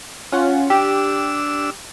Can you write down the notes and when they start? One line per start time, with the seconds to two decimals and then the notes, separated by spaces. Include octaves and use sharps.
0.32 C#4 F4 F#5
0.70 D4 G4 E6